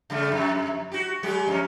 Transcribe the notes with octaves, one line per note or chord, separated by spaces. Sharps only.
C#3 G3 A3
F2
F#4 G4
F#3 G#3 G4
F2 C#4